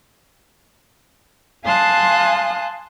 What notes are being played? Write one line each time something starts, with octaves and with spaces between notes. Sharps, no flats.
F5 G#5 A5 C6 D#6 F#6